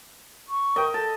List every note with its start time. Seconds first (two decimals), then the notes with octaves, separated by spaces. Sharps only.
0.48 C#6
0.76 A#4 D#5 G5
0.94 A4 A5